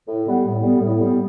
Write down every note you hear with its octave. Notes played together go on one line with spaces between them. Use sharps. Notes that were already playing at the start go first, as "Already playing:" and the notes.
A2
G3 B3
A2
G3 B3
A2
G3 B3